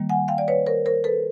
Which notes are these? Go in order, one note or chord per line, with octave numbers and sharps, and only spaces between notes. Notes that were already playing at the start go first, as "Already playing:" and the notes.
Already playing: D#3 G3 A#3
F#5 G#5
F5 G5
D5
B4 C#5
A#4 C5
A#4 C5
A4 B4